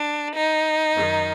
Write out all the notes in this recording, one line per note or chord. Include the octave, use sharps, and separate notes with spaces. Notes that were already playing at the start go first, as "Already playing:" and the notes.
Already playing: D4
D#4
F#2 D#3